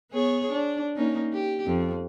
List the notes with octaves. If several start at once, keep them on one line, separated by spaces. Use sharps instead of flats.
B3 G#4 C#5
D4
A#3 C#4 D#4
G4
F2